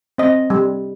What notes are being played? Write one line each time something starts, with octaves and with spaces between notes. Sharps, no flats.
C4 D#5
G3